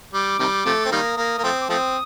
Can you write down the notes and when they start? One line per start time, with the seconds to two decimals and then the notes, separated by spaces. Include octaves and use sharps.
0.13 G3 D6
0.39 C3 D#3 G3
0.65 C3 F3 A3
0.86 C4
0.92 D#3 G3 A#3 D#6
1.17 A#3
1.38 A#3
1.44 F3 A3 C4
1.61 D6
1.69 F3 A3 C4 D#6